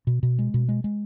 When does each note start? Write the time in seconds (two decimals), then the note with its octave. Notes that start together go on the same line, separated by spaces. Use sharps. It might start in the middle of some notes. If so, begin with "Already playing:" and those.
0.07 B2
0.23 B2
0.39 G#3
0.54 B2
0.69 G#3
0.84 G#3